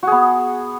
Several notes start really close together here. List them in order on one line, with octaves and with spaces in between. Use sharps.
F#4 G#4 B3